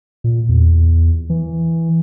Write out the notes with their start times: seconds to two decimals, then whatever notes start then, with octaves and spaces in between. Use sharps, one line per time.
0.24 A#2
0.49 E2
1.30 E3